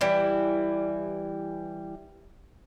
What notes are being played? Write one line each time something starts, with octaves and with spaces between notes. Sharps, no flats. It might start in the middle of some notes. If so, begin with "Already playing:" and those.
E3 G3 E4